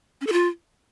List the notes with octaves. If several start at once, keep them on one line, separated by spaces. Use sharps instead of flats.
C#4
A4
F4